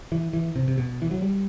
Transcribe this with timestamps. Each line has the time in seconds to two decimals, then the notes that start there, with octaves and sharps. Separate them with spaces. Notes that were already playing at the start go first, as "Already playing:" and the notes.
0.12 E3
0.33 E3
0.56 C3
0.68 C3
0.78 B2
1.02 E3
1.11 F#3
1.22 G3